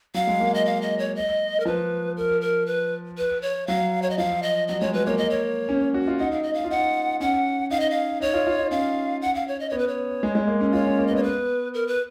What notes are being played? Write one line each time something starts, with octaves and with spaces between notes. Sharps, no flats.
F#3 F5
G#3
A#3
D#5
F5
D#5
C#5
D#5
A#4
F3 B4
A#4
A#4
B4
B4
C#5
F#3 F5
C#5
D#5
F3 F5
D#5
F#3 D#5
G#3 C#5
F#3 B4
A#3 C#5
D#5
C#5
C#4
F#4
F4
D#4 F#5
F5
D#5
F5
F4
D#4 F#5
C#4 F#5
D#4 F5
D#5
F5
D#4 C#5
F4
F4
D#4
C#4 F5
F#5
F5
C#5
D#5
B3 C#5
B4
C#5
G#3
G#3
A#3
C#4
F4 C#5
C#4
A#3
D#5
B3
C#5
B4
A#4
B4